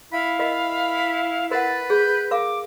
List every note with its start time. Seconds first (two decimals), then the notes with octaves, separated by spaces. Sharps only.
0.12 E4 F5 B5
0.39 A#4 D#5 B5
1.51 A#4 B4 F#5 A6
1.90 G#4 G6
2.31 A#4 F5 D6